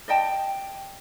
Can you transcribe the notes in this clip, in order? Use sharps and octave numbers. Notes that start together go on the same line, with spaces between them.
D5 D#5 G5 A5